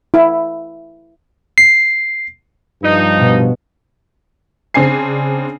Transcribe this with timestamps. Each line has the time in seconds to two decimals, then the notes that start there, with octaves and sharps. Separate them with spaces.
0.14 E4
1.58 C7
2.83 G2 F3 D#4
3.18 B2
4.74 C#3 C4 D4 G#5 C7